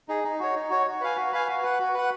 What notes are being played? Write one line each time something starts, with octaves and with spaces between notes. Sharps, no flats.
D#4 G#4
D#4
F#4 C#5
D#4
F#4 C#5
F#4
B4 F5 G#5
F#4
B4 F5 G#5
F#4
B4 F#5
F#4
B4 F#5